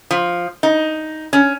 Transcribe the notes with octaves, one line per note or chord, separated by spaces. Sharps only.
F3
D#4
C#4